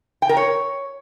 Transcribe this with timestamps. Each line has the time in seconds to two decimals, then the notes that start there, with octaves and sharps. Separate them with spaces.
0.22 G5
0.29 A#4
0.37 C#5